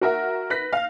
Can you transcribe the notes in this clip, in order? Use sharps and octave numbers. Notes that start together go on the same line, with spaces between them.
F#4 A#4 E5 F#5
B4 F#6 A#6 B6
F5